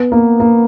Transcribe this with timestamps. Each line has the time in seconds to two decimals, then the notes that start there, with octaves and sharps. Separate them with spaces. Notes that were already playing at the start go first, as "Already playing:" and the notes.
Already playing: B3
0.12 A#3
0.40 A#3